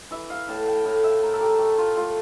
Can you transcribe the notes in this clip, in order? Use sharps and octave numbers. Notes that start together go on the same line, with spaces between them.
E3 E5
F5
A2 A5
G5
A2 F5
E5
A3 A#4
A4
G4
A3 G4
F4
A3 F4